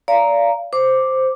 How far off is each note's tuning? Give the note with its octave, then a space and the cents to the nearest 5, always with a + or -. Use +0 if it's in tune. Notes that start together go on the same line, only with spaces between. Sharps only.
D5 -25 F5 -20 A#5 +0
C5 +0 D6 +0